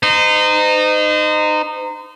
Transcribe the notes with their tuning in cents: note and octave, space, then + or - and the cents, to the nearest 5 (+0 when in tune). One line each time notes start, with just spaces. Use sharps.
D#4 -20 C5 -35